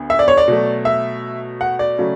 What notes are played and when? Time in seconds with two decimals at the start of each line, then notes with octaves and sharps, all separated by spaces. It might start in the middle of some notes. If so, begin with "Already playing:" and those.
Already playing: D2 D3 B3
0.10 E5
0.19 D5
0.28 C#5
0.37 D5
0.48 B2 F#3 A3
0.85 E5
1.61 F#5
1.79 D5
1.98 C#3 F#3 A3